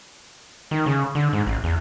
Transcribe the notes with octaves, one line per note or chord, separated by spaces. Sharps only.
D#3
C#3
D3
G#2
A1
E2